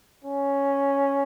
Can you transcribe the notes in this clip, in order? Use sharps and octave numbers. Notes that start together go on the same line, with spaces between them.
C#4